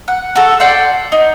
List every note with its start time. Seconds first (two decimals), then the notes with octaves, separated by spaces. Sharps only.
0.08 F#5
0.35 F#4 A4
0.60 D5 F#5 G5 C6
1.12 D#4